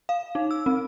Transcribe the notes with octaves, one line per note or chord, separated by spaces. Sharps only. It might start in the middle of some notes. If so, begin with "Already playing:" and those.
F5
D#4
E6
C4